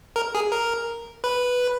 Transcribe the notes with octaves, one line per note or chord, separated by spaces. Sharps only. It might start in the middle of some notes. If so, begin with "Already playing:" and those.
A#4
G#4
A#4
B4